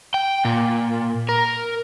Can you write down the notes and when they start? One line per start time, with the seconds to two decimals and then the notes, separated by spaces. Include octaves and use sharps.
0.14 G5
0.45 A#2
1.29 A#4